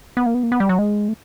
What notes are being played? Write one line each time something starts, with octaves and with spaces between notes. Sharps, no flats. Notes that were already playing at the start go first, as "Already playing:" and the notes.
B3
A#3
B3
A#3
B3
G3
F#3
G#3
A3